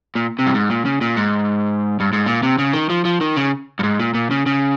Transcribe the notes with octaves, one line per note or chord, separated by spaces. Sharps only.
A#2
C3
G2
G#2
A#2
C#3
A#2
G#2
G2
G#2
A#2
C3
C#3
D#3
F3
F3
D#3
C#3
G2
G#2
A#2
A#2
C#3
C#3